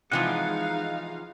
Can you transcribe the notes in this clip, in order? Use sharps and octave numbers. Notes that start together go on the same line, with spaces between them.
C3 E3 F3 G#3 D#4 F5 F#5